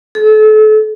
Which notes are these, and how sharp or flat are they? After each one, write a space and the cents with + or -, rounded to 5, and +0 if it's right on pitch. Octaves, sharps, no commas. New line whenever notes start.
A4 -35